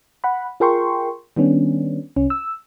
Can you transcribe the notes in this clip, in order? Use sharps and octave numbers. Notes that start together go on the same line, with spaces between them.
F#5 B5
F4 G#4 A#4 G5 C6 C#6
D#3 G3 B3 C#4 D4
C2 C#4
E6